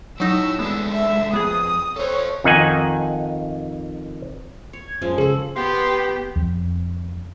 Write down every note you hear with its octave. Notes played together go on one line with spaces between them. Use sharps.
F#3 D#4 E4 C#5 E6
G#3 A3 B3 D4
E5
F2 B3 G#4 D#6
A4 C5 C#5
F2 D#3 D#4 F#5 G#5
C#5
G#6
F#2 F3 G#3 C#4
C#3 C#4 G#4 A4
B3 G4 C6
F2